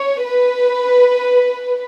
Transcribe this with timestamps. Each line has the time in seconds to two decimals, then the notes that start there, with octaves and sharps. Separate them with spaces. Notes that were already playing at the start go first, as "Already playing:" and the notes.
Already playing: C#5
0.24 B4